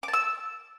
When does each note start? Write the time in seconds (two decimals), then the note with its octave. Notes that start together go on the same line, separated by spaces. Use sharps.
0.03 D6
0.08 A5
0.13 E6